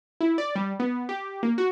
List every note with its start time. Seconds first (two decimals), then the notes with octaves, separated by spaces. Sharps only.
0.21 E4
0.38 D5
0.56 G3
0.80 B3
1.09 G4
1.43 A#3
1.58 F#4